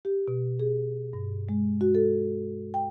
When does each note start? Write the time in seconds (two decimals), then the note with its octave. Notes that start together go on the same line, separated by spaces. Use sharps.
0.05 G4
0.28 B2
0.60 G#4
1.13 G2
1.49 G#3
1.81 F#4
1.95 A4
2.74 G5